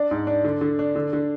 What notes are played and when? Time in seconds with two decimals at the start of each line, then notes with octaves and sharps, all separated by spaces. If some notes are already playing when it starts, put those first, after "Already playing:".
Already playing: D4 D5
0.11 G#2
0.27 D4
0.44 D3
0.61 D3
0.79 D4
0.96 D3
1.13 D3